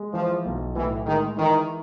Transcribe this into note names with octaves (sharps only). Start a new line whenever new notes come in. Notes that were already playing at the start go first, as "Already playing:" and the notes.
Already playing: G#3
E3 F3
B1
A2 E3
D#3 G#3
D#3 E3